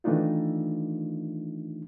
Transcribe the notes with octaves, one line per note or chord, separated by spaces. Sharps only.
D#3 E3 A3 D4 D#4 F4